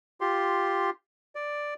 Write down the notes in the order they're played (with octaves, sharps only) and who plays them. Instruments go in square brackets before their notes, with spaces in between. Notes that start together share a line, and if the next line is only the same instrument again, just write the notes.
[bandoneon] F4 G4 C6
D5